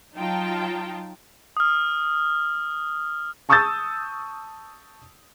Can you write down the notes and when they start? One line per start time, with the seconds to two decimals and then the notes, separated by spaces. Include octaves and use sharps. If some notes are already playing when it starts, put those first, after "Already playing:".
0.15 F#3 D#4 F4 G5 A5
1.57 D#6 F6
3.49 A5 C#6 D#6 E6 G6 A6